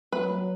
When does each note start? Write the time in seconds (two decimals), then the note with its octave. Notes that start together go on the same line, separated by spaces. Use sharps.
0.12 F#3 B4
0.30 F#3